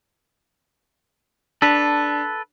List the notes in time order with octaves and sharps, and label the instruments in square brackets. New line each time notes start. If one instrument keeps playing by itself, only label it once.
[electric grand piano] D4 [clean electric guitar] A4 B4